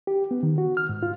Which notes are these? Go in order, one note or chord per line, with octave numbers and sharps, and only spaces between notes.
G4
B3
D#3
F#4
F6
G#2
F4